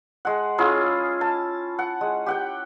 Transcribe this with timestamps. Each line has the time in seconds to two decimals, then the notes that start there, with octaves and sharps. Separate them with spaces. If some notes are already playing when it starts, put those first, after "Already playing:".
0.25 G#3 F#5
0.58 C#4 E4 F4 G#4
1.21 A5
1.79 F#5
2.01 G#3
2.26 G4 F#5 G5